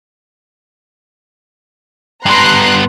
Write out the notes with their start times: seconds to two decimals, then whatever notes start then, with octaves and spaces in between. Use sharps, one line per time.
2.26 G2 B3 A#5 C6 F#6